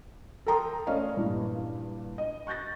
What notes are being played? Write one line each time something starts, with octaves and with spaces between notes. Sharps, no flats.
A4 A#4 G5 A#5 C6 D#6
A3 C#4 D5 D#5 F5
G2 A#2 E3
D#5
C#6 F#6 G6 A6 A#6